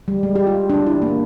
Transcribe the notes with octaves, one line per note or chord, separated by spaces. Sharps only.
G3
G#3
G4
F4
D4
E4
A#3